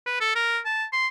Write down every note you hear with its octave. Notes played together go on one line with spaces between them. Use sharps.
B4
A4
A#4
A5
C6